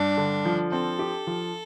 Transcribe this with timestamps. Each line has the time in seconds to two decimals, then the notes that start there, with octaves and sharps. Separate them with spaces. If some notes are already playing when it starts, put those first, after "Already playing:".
Already playing: G2 D4
0.18 D3
0.45 F3
0.72 C4 A4
0.99 G4
1.27 F3